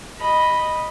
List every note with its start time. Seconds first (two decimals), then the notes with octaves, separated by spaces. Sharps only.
0.19 D#5 B5